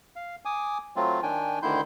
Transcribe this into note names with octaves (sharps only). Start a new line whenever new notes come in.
F5
G#5 D6 D#6
F#3 A3 C4 F4
D#3 D4 G5 G#5
D2 D3 D#3 E4 C6 G6